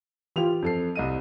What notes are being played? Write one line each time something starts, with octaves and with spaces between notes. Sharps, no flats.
E3 F4 G4 F7
F2 A4 C7
C2 D#5 D#7